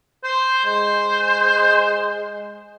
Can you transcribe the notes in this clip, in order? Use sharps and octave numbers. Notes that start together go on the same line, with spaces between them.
C5
G#3 C5